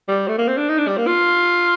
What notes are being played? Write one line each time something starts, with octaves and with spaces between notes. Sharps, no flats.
G3
A3
A#3
C4
D4
D#4
D4
G3
A#3
F4